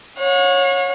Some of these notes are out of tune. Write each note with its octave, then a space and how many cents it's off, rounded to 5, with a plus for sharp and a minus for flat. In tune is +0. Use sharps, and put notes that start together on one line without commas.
C#5 -10 F#5 -45